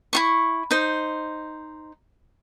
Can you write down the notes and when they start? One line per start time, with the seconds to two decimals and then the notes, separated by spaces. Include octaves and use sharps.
0.13 E4 F4 C#6
0.71 D#4 C5